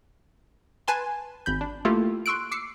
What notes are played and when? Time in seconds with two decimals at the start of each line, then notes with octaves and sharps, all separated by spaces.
0.88 B4 G#5 A5 C6
1.46 G#1 B5 G6
1.61 D4
1.85 A3 A#3 E4 F4 G4 A4
2.26 C6 C#6 E6 F#6 D7
2.52 D6 E6 C7 C#7